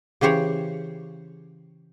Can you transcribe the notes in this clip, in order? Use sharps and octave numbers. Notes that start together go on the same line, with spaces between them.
C#3 E3 G4 C5 C#5